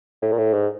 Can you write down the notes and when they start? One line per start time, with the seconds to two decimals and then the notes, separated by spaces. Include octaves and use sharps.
0.22 A2
0.32 A#2
0.38 A2
0.53 G#2